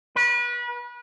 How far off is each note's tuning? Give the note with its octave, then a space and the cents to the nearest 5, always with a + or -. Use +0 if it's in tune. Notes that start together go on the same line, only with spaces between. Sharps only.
B4 -30